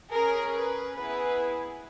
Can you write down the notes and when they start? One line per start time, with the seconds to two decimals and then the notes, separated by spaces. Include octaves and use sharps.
0.11 C#4 G#4 A#4
0.54 B4
0.95 B3 E4 G#4 B4